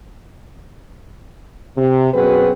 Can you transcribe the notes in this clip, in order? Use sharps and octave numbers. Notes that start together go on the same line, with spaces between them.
C3
F#2 B2 C4 F#4 G#4 B4